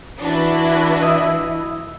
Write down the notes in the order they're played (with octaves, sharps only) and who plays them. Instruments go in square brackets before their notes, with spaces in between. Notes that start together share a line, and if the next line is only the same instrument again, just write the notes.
[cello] E3 F#4 [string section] D4 B4 [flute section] E4
[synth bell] D#5 D#6 E6